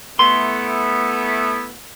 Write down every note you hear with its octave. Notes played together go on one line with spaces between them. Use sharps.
A3 B3 E4 C6